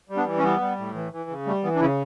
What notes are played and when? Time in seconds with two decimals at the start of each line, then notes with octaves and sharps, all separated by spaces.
0.09 G3
0.17 B3 D4
0.25 E3
0.38 C#4
0.43 G3 B3
0.61 G3
0.78 A2
0.95 E3
1.12 E3
1.30 C#3
1.46 G3 A3
1.64 E3 B3
1.75 D4
1.80 C#3 C#4 E4